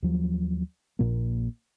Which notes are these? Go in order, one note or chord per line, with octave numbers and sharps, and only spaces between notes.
D#2 F3 F#3
A#1 A#2 A#3